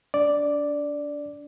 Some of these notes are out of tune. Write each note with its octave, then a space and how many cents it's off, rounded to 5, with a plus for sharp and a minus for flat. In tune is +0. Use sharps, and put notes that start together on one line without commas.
D4 -30 D5 +0